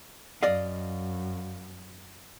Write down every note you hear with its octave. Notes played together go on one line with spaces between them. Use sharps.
F#2 D5 D#5 F5